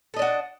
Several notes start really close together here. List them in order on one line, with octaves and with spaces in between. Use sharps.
A4 D#5 D4 F#4